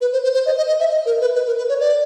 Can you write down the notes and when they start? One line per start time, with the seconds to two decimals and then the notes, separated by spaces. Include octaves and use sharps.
0.01 B4
0.13 C5
0.24 C5
0.34 C5
0.46 D#5
0.57 D#5
0.68 D#5
0.80 E5
0.90 D#5
1.06 A#4
1.21 B4
1.35 B4
1.47 A#4
1.58 B4
1.69 C#5
1.80 D5